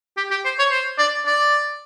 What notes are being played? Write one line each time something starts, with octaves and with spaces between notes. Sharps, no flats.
G4
G4
C5
C#5
C5
D5
D5